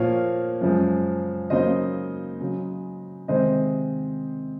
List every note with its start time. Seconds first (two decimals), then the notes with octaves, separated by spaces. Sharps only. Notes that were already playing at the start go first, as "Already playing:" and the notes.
Already playing: A#2 F3 A#3 C#5 F5
0.61 F#2 C#3 F3 G#3
1.50 C#3 F#3 A#3 D#4 C5 D#5
2.40 C#3 F#3 C#4
3.28 C3 D#3 G#3 C4 D#4 C5 D#5